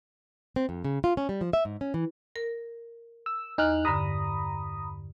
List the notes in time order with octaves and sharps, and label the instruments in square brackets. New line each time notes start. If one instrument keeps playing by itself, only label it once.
[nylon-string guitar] C4
F2
C#3
F4
C#4
G3
F3
E5
G#2
C#4
E3
[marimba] A#4
[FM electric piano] E6
[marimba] E2 [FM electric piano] D#4 F6 F#6
[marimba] G2 D3 [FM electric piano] A#5 B5 D#6